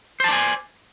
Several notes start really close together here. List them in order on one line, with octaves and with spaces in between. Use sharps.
C5 A5 D5 G#5